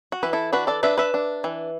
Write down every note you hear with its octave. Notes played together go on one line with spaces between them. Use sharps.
F#4
E3 B4
E4 A4
D4 F#4 B4
A4 D5
D4 B4 E5
B4 E5
D4
E3